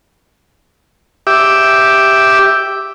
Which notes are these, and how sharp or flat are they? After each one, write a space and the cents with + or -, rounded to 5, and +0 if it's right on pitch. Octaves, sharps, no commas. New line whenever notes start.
G4 +0 E5 +0 D6 +0